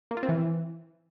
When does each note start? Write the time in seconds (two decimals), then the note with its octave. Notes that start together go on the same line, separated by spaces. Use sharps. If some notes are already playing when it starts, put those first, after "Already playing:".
0.11 A#3
0.17 F4
0.23 C4
0.29 E3